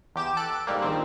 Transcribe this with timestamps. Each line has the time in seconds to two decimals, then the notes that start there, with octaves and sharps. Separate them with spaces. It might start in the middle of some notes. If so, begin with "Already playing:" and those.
0.16 E2 G4 D6 E7
0.37 A4 F#6 D7
0.67 G#2 G3 A#3
0.82 A#1 D#3 C4